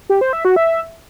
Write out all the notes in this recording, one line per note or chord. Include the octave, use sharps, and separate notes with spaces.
G4
C5
E5
F#4
E5